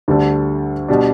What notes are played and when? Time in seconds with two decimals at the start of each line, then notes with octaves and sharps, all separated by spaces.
0.08 D2 D3 G3 D4 A4
0.88 B2 G3 D4